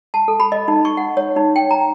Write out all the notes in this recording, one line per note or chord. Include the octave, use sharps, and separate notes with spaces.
A5
A4
B5
D#5
D#4
C#6
F#5
C#5
D#4
G5
A#5